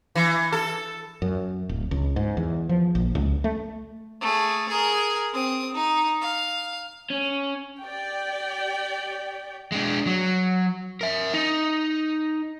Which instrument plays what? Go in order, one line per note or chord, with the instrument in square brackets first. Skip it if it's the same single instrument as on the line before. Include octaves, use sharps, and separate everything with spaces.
[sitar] E3
A4
[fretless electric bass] F#2
D1
C#2
G#2
E2
F3
A#1
C#2
A3
[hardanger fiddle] A3 G#4
G#4 A#4
C4 D#6
D#4
F5
[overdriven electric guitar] C#4
[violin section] G4 D5 G5
[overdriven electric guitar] G#3 D4
F#3
A#4 E5
D#4